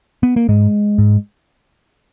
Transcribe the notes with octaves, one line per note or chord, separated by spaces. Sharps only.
B3
A#3
G#2 G#3
G#2